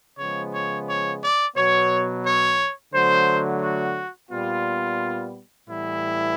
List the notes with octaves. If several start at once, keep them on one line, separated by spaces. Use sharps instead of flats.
C#3 F3 G#3 B3 C#5
C#5
C#5
D5
B2 F#3 B3 C#5
C#5
D3 F#3 A3 C5
F#4
A#2 G3 B3 F4
A2 E3 G3 B3 E4